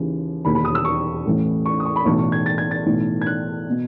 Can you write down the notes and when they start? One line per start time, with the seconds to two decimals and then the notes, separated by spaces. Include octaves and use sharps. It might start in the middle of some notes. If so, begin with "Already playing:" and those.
Already playing: D#2 C#3 E3
0.45 E1 D#2 D#3 B5
0.55 B5
0.65 D#6
0.75 E6
0.85 C#6
1.25 A1 A2 E3
1.66 C#6
1.80 D#6
1.85 C#6
1.96 B5
2.05 B1 A2 E3 C#6
2.19 C#6
2.32 G#6
2.46 A6
2.58 G#6
2.71 A6
2.86 B1 A2 E3
3.21 G#6
3.26 F#6
3.70 B2